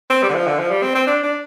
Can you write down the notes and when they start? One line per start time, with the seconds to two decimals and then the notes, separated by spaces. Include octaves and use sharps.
0.10 C4
0.23 G3
0.29 D3
0.34 F3
0.46 D3
0.59 F3
0.70 G3
0.82 C4
0.95 C4
1.07 D4
1.23 D4